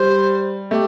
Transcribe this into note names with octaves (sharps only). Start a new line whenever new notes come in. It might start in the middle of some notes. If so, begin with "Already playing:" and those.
Already playing: G3 C5
A3 G4